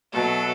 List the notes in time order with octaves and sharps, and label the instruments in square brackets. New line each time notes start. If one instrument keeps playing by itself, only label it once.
[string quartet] B2 F#3 A3 A4